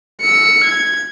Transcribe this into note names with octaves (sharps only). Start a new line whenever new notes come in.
E6 C#7
G#6